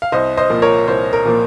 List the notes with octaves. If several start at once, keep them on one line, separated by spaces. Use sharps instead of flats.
F5
C2 C5 D#5
C5 D#5
A#2 F3 A#3
A#4 C#5
C2 C5
A#4
A#2 F3 A#3